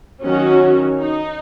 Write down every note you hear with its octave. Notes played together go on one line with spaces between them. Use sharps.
D#3 F#3 C#4 F#4
D#4